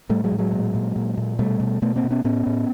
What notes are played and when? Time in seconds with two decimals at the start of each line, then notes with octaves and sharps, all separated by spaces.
0.09 A2 G3 A3
0.24 F#3 G#3
0.32 A2
0.38 F#3 G#3
0.52 A#2
0.74 A#2
0.96 A#2
1.17 A#2
1.39 B2 G3 A3
1.60 B2
1.82 B2 A3 B3
1.96 A#3 C4
2.04 B2
2.11 B3 C#4
2.24 A2 B3 C#4
2.46 A2